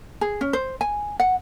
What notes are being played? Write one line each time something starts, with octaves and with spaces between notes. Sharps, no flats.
G#4
C#4
C5
G#5
F#5